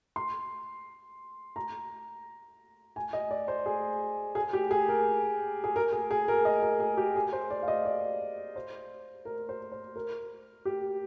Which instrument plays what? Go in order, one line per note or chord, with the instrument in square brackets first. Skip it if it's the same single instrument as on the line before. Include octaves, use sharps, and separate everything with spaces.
[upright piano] C6
A#5
G#5
D#5
D5
C5
G#4
G#4
G4
G#4
A#4
G#4
A#4
G#4
G#4
A#4
D#5
A#4
G#4
G4
G#4
C5
D5
F5
D#5
D5
C5
A#4
C5
C5
A#4
G4